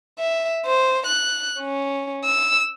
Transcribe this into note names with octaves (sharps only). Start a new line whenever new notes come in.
E5
C5
F#6
C#4
E6